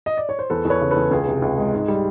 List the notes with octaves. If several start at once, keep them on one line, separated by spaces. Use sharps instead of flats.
D#5
D5
C#5
C5
E2 A4 B4
E2
B4 C#5
C#3
A4 B4
E2
C#2 G#4
C3
C#2
G#3
G#2
G3